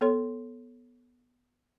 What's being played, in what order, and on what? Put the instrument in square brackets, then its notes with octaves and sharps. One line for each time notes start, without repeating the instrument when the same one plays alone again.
[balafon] B3 A4 C#5 C6